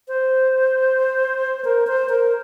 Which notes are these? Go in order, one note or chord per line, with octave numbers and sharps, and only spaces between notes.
C5
A#4
C5
A#4